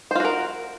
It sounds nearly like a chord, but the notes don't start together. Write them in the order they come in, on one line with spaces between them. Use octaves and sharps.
C5 F4 F#4 A#4